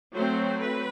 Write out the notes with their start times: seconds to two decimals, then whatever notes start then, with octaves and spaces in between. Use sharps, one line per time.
0.14 F#3 A3 C4 C5
0.60 B4